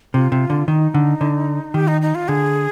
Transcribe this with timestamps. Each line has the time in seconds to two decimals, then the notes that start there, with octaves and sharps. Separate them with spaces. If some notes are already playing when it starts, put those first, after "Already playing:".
0.14 C3 F4
0.32 C3
0.50 D3
0.68 D#3 D#4
0.94 D3
1.21 D3
1.74 D#3 G4
1.88 D#4
2.02 D#4
2.15 F4
2.28 D3 G#4